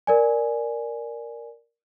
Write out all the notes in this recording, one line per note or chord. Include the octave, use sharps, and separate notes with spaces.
A#4 D5 G#5